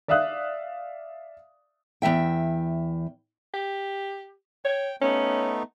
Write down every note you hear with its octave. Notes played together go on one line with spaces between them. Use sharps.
D5 E5 F5 D#6 F#6
E2 D#3 E5 G5
G4
C#5 G5
A3 B3 C#4 D#4